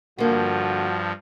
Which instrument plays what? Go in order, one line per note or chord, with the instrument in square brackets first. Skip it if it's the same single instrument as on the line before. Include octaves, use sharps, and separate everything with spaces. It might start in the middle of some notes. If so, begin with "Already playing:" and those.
[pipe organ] G2 F3 [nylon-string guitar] D3 A#3 [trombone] F#4